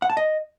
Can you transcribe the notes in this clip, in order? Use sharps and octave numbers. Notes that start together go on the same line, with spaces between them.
F#5
A5
D#5